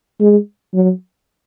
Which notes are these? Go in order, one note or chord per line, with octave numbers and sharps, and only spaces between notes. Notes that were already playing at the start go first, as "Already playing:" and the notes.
G#3
F#3